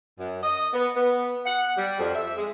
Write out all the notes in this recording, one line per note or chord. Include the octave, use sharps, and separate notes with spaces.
F#2
D#5
B3
B3
F#5
G3
F2
E5
G#3